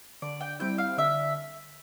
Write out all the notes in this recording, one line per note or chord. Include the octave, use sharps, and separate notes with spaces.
D3 D5
G5
G3 C4 E4 G5
F5
D3 E5